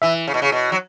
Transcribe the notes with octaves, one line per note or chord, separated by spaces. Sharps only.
E3 E5
C#3
B2
C#3
B2
F#3